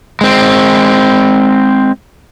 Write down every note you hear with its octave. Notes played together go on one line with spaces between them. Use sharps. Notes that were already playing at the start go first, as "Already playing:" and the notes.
G#3 C4